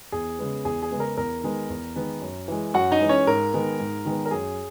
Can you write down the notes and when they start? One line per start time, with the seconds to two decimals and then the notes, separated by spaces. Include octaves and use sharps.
0.12 E2 G#4
0.39 C#3 G#3 B3
0.65 E2 G#4
0.83 G#4
0.91 C#3 G#3 B3
1.00 A#4
1.17 E2 A#4
1.43 D#3 G#3 B3
1.69 E2
1.96 D#3 G#3 B3
2.21 F#2
2.48 E3 G#3
2.74 F#2 F#4 F#5
2.92 D#4 D#5
3.01 E3 G#3
3.09 C#4 C#5
3.27 G#2 A#4
3.53 D#3 G#3 B3
3.79 G#2
4.05 D#3 G#3 B3
4.26 A#4
4.31 F#2 G#4